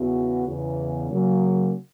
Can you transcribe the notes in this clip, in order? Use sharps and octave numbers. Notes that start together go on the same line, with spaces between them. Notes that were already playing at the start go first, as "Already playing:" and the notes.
Already playing: E2 C#3 E3 B3 F#4
E2 C#3 E3
C#3 F#3 A#3